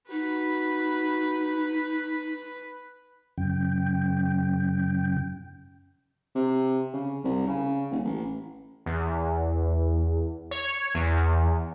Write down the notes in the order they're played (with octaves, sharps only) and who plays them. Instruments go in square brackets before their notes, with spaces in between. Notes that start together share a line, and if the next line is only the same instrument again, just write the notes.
[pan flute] D#4 [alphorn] F#4 [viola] B4 B5
[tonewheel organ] F#2 C#3 G5
[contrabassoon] C3
C#3
C2
C#3
D#1
A1
[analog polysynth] E2
C#5
E2